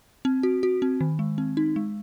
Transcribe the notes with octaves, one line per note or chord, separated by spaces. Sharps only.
C4
F#4
F#4
C4
D#3
G#3
C4
D#4
G#3